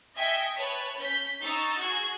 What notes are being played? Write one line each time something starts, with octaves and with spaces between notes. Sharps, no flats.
D#5 E5 G5 G#5 B6 C#7
B4 C#5 A5
C#4 G6 B6
D#4 C#6 E6 A6
F#4 G#4 G#6